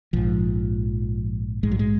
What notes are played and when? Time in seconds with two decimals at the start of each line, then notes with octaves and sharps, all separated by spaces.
0.13 A#1 G#2 F3
1.63 A#1 G#2 G#3
1.72 F#3
1.79 G#3